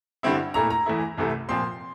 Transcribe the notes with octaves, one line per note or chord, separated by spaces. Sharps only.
G2 D3 G3 C4 E4
A#2 A3 E4 A#5
A#5
E2 E3 A3 E4
C2 C3 E3 A3
A#2 F3 C4 C6